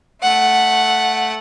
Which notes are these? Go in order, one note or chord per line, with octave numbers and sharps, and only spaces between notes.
A3 F#5